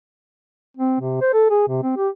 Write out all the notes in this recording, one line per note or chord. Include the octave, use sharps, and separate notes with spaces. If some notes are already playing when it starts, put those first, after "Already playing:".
C4
C3
C5
A4
G#4
C3
C4
G4